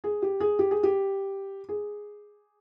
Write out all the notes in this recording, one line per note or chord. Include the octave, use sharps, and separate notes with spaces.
G#4
G4
G#4
G4
G#4
G4
G#4